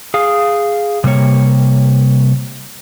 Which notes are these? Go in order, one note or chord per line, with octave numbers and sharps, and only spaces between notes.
G#4 F5
C3 G3 A#3 C#5